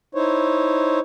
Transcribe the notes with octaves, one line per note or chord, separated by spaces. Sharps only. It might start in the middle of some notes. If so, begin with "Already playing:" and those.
D#4 E4 C5 C#5